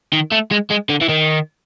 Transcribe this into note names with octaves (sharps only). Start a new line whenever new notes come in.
D#3
A3
G#3
G#3
D3
E3
D#3